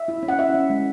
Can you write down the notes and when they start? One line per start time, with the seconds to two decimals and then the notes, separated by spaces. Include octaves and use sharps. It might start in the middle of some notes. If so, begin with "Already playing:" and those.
Already playing: E5
0.08 E4
0.23 C#4
0.28 F#5
0.39 E4 E5
0.54 C#4
0.70 G#3